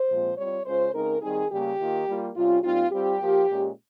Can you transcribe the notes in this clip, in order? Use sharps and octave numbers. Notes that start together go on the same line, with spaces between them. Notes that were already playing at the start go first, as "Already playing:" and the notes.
Already playing: C5
A#2 F3 G#3 C4 F4
G3 C4 F4 C#5
C#3 G#3 C#4 F4 C5
C#3 G#3 C4 D#4 A#4
D#3 G3 C4 D#4 G#4
C#3 G3 A#3 G4
D#3 A#3 F4
G3 A#3 F4
C3 G3 C#4 F4
A#2 G3 C4 D#4 F4
G3 C4 F4 G4
F3 A#3 F4
A#2 G#3 C#4